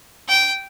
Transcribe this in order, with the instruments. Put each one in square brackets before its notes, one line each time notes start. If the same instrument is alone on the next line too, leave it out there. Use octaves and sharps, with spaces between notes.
[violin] G5